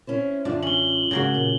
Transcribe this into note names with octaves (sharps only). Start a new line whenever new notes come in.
C#4 E4 C5
F#2 D3 D4 F4
C#4 F#7 G7
G#2 C#3 F#3 A#3 F#4
A#2